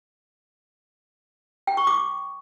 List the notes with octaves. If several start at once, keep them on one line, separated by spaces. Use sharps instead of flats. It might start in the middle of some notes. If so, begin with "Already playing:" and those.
G5
C#6
D6